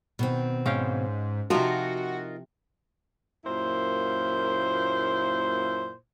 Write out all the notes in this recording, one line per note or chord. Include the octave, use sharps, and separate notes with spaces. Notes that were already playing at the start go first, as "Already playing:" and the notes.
B2 D#3 C4
G#2 C#4 F5 G5
C3 F3 D#4 F4 F#4 A#4
F#2 A#2 A#3 E4 C5